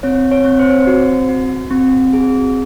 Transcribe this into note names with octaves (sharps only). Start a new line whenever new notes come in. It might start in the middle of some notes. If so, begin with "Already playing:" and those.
C4 C#5
C#5
C4
C5
C#5
C5
F#4
F#4
C4
G#4